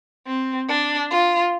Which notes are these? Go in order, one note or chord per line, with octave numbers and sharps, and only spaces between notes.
C4
D4
F4